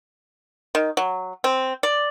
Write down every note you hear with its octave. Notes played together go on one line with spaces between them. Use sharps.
D#3
F#3
C4
D5